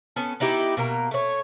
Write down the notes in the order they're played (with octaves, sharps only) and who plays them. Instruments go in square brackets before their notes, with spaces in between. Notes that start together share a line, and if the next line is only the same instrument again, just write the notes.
[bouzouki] B3 C#4 A4
B3 D#4 E4 G4
B2 A#3 A#4
A3 C#5